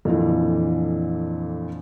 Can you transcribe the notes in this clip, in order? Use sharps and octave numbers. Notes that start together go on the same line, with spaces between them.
F2 A#2 D3 E3